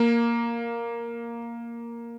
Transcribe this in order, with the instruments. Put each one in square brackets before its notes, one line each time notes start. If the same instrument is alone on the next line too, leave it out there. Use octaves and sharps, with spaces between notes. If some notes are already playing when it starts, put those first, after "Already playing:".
Already playing: [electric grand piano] A#3